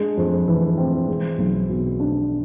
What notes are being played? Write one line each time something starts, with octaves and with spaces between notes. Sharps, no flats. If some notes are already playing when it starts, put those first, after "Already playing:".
Already playing: G#3 D4
F2
E3
C4
G#3
B1
B2
D4